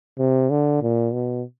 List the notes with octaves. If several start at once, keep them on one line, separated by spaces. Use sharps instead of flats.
C3
D3
A#2
B2